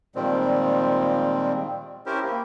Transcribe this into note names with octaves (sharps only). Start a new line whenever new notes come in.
A#2 D#3 F3 G3 G#3 C4
C#4 E4 G4 A#4 C5
A#3